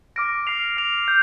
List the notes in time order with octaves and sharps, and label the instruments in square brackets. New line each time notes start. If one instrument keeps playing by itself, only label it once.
[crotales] D6 F6 A#6 D7
F6 C7 F7
F6 C7 F7
G6